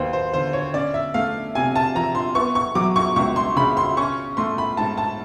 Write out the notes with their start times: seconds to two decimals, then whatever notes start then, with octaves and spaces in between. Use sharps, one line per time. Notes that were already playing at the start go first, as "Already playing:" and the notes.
Already playing: D#2 F#3 B4 C5
0.13 C5
0.33 D3 C5
0.53 C#5
0.74 C#4 D5
0.94 E5
1.14 A3 F5
1.55 C3 G#5
1.76 A5
1.95 F3 A#5
2.15 C6
2.35 B3 C#6
2.55 C#6
2.75 F#3 D6
2.96 C#6
3.16 C#2 C#6
3.36 C6
3.56 C#3 B5
3.77 C6
3.97 C#4 C#6
4.37 A3 C6
4.58 B5
4.77 G#2 A5
4.98 A5